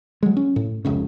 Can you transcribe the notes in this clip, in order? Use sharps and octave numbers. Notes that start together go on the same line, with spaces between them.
F#3 G#3
C#4
A2
F1 C#2 C#3